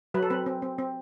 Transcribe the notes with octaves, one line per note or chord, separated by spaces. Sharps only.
F#3 B4
A4
C4 B4
C4
C4
C4